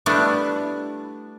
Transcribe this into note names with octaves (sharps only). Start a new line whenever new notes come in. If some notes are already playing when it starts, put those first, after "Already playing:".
G3 A3 B3 D4 E4